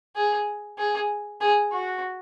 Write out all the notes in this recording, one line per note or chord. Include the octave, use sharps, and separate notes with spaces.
G#4
G#4
G#4
F#4